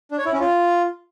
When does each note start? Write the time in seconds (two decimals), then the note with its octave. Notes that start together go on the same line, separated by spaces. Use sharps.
0.11 D4
0.18 C#5
0.26 E4
0.33 C#4
0.40 F4